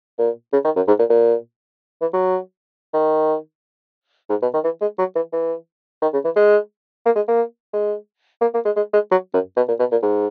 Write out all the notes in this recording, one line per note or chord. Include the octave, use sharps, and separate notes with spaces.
A#2
C#3
D#3
F#2
G#2
A#2
A#2
E3
F#3
D#3
G#2
B2
D#3
E3
G#3
F#3
E3
E3
D#3
C#3
E3
G#3
A#3
G#3
A#3
G#3
A#3
A#3
G#3
G#3
G#3
F#3
F#2
B2
A#2
B2
A#2
G#2